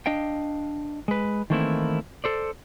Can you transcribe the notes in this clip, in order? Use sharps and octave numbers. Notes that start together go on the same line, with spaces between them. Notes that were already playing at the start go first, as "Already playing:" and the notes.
D4 D#5 F5 G5
G#3 B4
D#3 E3 A3 A#3 C4 E4
A4 C5 D5